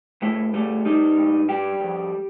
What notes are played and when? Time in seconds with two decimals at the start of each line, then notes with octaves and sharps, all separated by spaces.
0.22 G2 A3
0.54 G3 A3
0.85 G3 D#4
1.17 G2
1.48 G3 G4
1.80 F2